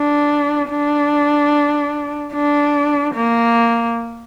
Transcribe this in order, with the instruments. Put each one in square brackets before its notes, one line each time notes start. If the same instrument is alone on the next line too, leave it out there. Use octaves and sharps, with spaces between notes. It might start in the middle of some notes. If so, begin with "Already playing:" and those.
Already playing: [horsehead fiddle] D4
D4
D4
A#3